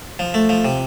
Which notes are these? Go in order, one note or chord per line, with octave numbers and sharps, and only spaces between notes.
F3
A3
F3
C3